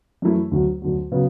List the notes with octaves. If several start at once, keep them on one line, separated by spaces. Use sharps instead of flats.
F#2 E3 A3 E4
D2 D3 F#3
D2 D3 F#3
C#3 F#3 B3